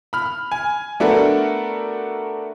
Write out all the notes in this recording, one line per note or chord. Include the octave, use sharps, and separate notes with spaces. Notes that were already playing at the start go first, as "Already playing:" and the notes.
B5 F6
G#5
A3 B3 D4 F#4 A4 A#4